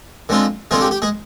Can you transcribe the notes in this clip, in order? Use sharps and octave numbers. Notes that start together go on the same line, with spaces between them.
D3 G#3 C4 F4
D3 G#3 C4 F4 G#4
G4
G4
G#3 G#4